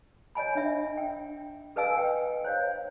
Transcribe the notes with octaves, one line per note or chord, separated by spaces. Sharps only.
C#5 D#5 G#5 B5
D4 E5
G5
A4 B4 D#5 F5 G#5 E6
G5
C5 C#5 F5